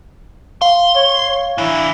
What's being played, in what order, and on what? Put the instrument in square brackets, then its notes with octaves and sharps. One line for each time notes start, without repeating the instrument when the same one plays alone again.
[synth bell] F5 [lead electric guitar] C6
[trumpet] C#5
C#5
[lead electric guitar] E3 D4 [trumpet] E4